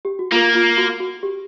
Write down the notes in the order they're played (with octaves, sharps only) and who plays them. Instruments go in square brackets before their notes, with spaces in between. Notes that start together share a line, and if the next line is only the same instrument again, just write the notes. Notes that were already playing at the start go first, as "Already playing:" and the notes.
[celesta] G4
F#4
[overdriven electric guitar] A#3 [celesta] F4
[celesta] F4
F#4
F#4
G4